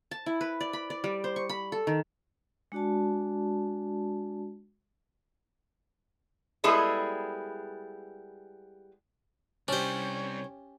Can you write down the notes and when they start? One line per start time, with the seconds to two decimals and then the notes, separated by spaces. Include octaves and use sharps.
0.11 A5
0.26 E4
0.41 B4
0.61 D5
0.73 B5
0.90 D5
1.04 G3
1.24 C5
1.36 C#6
1.49 B5
1.72 A4
1.87 D#3
2.72 G#3 D4 F#4 D5 A5
6.64 G3 G#3 B3 E4 G#4 A4
9.68 C2 G3 C#4 D4 G4 C5 C#5